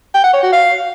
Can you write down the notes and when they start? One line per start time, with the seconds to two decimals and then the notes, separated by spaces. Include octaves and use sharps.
0.14 G5
0.24 F#5
0.33 C#5
0.43 F#4
0.52 F5